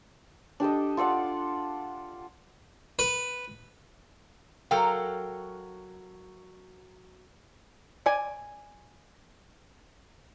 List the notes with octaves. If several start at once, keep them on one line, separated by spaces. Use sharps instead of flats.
D4 G4 A4 D#5
F4 A4 D5 F#5
B4
F#3 A4 A#4 F5 G5
D5 G#5